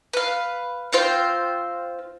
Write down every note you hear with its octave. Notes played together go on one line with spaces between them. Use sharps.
B4 F5
C4 F4 C5 G5